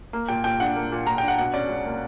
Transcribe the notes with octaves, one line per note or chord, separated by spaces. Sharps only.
A#3
A#2 G5
A#2 G5
D4 F#5
A#3
A#2
A#2 A#5
G5
D4
F#5
B2 F#5
C#4 D5
C#2
A#3